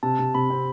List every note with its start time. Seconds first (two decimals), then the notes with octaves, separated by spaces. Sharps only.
0.03 C3 A5
0.19 C3
0.34 C3 B5
0.50 C4